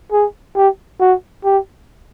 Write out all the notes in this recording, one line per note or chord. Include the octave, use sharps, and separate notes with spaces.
G#4
G4
F#4
G4